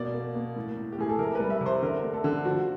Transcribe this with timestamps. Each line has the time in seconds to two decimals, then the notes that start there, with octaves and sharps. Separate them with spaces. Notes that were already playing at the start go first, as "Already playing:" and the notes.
Already playing: B2 A#3 D5
0.14 A#3
0.35 A#3
0.56 A2
0.77 A2
0.92 G4
0.98 A2 G#4
1.09 A4
1.18 C3 A#4
1.35 G3 B4
1.50 E5
1.61 C3
1.66 C5
1.82 D3 A#4
2.03 A3
2.14 A4
2.24 D3
2.45 F3 F#4